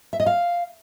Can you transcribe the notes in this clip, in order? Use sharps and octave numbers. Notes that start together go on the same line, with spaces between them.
E5
D#5
F5